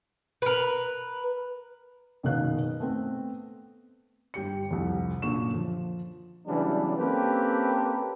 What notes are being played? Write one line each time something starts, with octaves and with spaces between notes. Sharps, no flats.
A#4 B4
F#1 B2 D#3 B4 F5 F#6
A3 B3 C4
G1 G4 C#7
C2 F2
F#2 A#2 D3 A#3 C#6 E7
F3
C#3 E3 F#3 G3 B3 D4
A#3 C4 C#4 G4 A4 B4